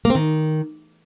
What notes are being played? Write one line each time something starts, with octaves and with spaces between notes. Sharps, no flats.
A#3
C4
D#3